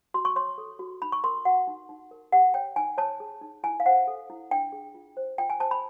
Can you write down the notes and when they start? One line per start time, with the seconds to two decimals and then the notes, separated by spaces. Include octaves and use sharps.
0.14 F#4 C6
0.25 C#6
0.36 C#5 C6
0.58 A4
0.79 F#4
1.02 D#4 B5
1.12 C#6
1.24 A#4 C6
1.45 F#4 F#5
1.67 D#4
1.89 D#4
2.11 A#4
2.32 G4 F#5
2.54 C#5 G5
2.76 D#4 G#5
2.98 C#5 A5
3.20 G#4
3.41 D#4
3.64 E4 G#5
3.80 F5
3.86 C5 F#5
4.07 A4
4.30 E4
4.51 D4 G5
4.72 G#4
4.95 F4
5.17 C5
5.38 F4 G5
5.50 G#5
5.60 C5 A5
5.71 B5